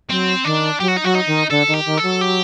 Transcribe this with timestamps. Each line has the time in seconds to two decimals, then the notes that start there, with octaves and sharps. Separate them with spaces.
0.09 F#3 C4
0.45 D#3 D4
0.80 F#3 G4
0.88 F#4
0.97 D#4
1.04 F#3 F#4
1.15 D#4
1.27 D#3
1.50 D3 A4
1.68 D#3
1.74 G4
1.86 D#3
1.97 A4
2.03 F#3
2.21 G4